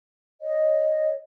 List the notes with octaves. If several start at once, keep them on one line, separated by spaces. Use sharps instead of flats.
C#5 D#5